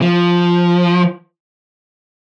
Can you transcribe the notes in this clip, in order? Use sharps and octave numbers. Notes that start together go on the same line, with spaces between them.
F3